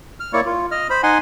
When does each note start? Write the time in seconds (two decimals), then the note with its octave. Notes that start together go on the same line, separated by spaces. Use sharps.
0.20 F6
0.33 A#3 E4 C#5 D5 C#6
0.46 F4
0.71 D#5 F6
0.90 C5 B5
1.03 D#4 F#5 G#5 C6